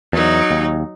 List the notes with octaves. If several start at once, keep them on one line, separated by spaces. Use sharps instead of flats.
E2 F#3 D#4
D#2